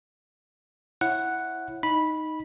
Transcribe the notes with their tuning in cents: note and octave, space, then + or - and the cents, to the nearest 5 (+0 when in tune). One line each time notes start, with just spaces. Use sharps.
E4 +0 C#5 -25 F#5 +0
D#4 +0 B5 -10